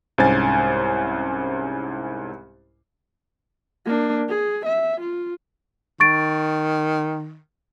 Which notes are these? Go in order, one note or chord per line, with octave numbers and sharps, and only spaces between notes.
C2 G#2 C#4 C5 G#5 A6
A#3 D4
G#4
E5
F4
D#3 C#6 A6 D7